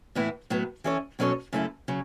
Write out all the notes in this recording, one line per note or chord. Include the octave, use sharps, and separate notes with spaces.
A2 E3 B3 E4
A2 F#3 B3
E3 C#4 A4 C#5
B2 F#3 C#4 A4 C#5
F#2 C#3 A3 E4 A4
C#3 F#3